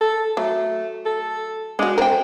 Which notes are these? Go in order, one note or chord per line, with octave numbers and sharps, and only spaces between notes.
A4
F#3 A3
A4
G#3 D4 F#4
C4 A#4 G5